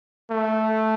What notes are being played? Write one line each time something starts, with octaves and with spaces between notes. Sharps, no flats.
A3